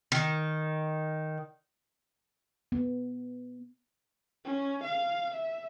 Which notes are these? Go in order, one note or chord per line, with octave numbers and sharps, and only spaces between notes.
D#3
B3
C#4
F5
E5